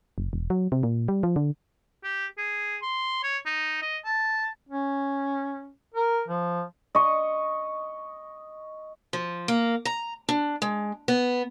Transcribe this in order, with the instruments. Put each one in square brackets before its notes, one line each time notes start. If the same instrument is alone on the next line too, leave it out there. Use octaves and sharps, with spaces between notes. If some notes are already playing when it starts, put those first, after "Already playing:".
[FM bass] F#1
E1
F#3
C3
A#2
G3
F3
D3
[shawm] G4
G#4
C6
C#5
D#4
D#5
A5
[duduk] C#4
A#4
F3
[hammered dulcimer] D#5 C#6
[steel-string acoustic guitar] F3
A#3
A#5
D4
G#3
B3